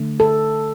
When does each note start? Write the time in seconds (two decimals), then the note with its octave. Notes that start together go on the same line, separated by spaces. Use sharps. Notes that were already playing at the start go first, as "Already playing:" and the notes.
Already playing: D3 A3
0.20 A4